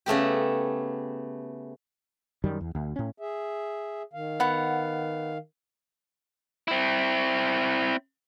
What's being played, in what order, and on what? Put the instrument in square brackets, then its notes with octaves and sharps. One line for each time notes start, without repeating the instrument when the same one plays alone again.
[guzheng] C#3 A3 B3 G4
[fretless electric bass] F#2 D#3 G3
E2
D2
A2 C#4
[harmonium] G#4 E5
D#3 F5
[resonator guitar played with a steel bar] B3 F#5
[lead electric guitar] C4 E4